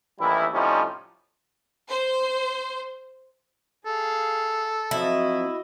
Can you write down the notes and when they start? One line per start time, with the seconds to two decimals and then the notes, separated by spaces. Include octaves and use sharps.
0.20 A1 D#2 E3 G3 E4
0.53 A2 C3 F3 G3 C#4 D#4
1.89 C5
3.86 G#4 A4 F5
4.91 F3 F#3 C4 E4 F#4 D#5